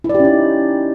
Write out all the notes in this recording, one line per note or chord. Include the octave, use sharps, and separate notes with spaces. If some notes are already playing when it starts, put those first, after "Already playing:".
E4
D5
G4
C#4
D#4